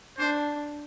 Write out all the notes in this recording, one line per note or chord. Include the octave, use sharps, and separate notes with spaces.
D4 C5